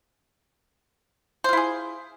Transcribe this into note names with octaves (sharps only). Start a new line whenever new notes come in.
E4 F4 G#4 C5